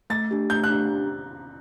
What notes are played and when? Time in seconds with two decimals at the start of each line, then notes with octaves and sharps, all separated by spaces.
0.10 A3 A6
0.31 D4 G4
0.50 A3 G6
0.64 F#6
0.70 D4 G4